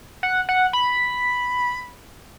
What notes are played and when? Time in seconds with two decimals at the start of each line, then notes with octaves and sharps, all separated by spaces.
0.23 F#5
0.49 F#5
0.73 B5